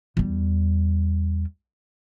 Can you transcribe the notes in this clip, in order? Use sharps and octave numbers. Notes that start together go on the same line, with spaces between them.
E2 G3